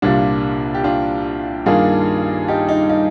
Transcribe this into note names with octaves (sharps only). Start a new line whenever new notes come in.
C2 A#2 G3 D4 F4
G4
D4 F4
G2 D#3 A#3 D4 F4 G#4
D#4 G4
D#4
D#4